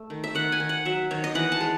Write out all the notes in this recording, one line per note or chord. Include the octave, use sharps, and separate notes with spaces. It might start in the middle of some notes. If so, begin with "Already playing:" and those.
Already playing: A3
D#3
E5
D#3 F#5
G#5
D#3
F#5
F#3 E5
D#3 C#5
D#5
E3 F#5
A5
G#3